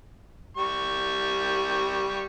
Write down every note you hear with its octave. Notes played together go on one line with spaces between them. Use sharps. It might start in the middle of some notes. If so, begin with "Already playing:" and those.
G3 C#6